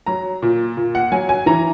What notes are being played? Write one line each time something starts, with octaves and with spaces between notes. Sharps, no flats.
F#3 A#5
A#2
A#2
F#5
F#3 G#5
G#5
E3 A#5